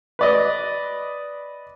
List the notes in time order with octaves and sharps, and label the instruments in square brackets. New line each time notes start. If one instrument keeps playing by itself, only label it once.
[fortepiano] B4 D5 D#5